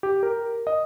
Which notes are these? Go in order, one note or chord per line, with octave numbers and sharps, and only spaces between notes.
G4
A#4
D#5